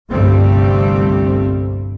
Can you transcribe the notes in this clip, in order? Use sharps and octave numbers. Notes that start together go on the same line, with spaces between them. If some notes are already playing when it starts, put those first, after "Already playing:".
G1 C2 G2 G3 A3 C4